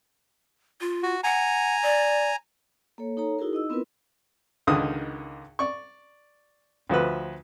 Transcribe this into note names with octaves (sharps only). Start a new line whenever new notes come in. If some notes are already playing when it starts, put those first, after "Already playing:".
F4
F#4
F#5 G#5 A#5
D5
A#3 A4 C#5
D#4 A4 C#5 A#5
D#4 E4 F#4 G#4 A#4
D#4 D#5 E6
B3 C4 E4 F4 A#4 B4
C#2 D3 D#3 D#4 D#6
D5 C#6
D2 F3 F#4 B4